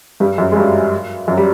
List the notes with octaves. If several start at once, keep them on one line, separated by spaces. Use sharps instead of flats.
G2 G3
F#2 F#3
G#3
G2 G3
F#2 F#3
G3